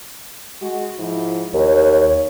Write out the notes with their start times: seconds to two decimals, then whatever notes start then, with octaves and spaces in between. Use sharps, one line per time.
0.62 G#3 F#4
0.99 G#2 F3 E4
1.54 D#2 C#5